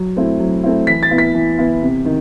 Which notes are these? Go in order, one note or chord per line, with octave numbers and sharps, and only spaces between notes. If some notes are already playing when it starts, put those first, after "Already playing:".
Already playing: F#3
A3 C4 E4
F#3
A3 C4 E4
E3 B6
A6
B3 E4
B6
E3
B3 E4
C3
D#3